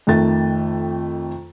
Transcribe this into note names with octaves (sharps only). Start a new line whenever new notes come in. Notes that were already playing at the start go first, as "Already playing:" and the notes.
F2 D#3 A3 A6